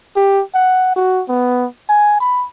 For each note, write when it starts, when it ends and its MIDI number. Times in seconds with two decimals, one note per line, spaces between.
0.16 0.42 67
0.54 0.91 78
0.96 1.23 66
1.28 1.66 59
1.89 2.18 80
2.20 2.46 83